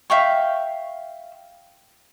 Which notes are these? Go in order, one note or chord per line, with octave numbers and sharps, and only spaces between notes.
E5 F5 G5 C#6